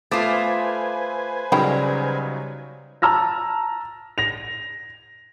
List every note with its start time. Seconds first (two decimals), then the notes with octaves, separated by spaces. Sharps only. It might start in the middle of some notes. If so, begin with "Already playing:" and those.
0.11 A3 F4 B4 C5 G#5 D6 D#6 A6
1.52 C#3 F#3 G3 C#4 D#4 G5 B5
3.02 A5 A#5 E6 F6 A#6
4.18 A#6 F7